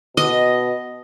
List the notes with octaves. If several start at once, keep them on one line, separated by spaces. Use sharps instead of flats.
B2 D#5